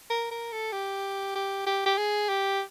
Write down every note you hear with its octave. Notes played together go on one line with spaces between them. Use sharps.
A#4
A#4
A4
G4
G4
G4
G4
G#4
G4